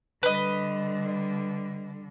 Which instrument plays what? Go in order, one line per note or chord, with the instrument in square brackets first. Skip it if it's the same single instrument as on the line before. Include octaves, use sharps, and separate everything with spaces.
[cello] D3 G3 [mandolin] B4 D#5